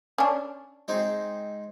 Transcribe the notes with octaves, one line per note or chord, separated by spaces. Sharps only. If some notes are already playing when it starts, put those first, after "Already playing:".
C#4 D4
G#3 C4 D#4